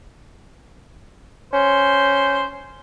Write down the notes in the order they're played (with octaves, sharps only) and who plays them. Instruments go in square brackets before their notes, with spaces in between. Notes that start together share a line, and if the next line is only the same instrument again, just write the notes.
[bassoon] C#4 [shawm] C5